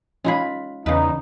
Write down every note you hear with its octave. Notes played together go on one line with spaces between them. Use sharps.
G#3 C#4 D#4 F4 G#4 B5
E2 C#3 D#4 B4